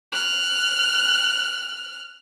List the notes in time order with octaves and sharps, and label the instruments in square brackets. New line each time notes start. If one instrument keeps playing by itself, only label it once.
[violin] F6 F#6